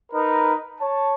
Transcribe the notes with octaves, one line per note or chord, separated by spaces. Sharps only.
D#4 A#4 B4
C#5 A5